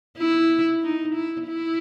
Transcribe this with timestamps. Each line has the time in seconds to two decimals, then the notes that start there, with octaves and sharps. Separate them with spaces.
0.17 E4
0.82 D#4
1.15 E4
1.47 E4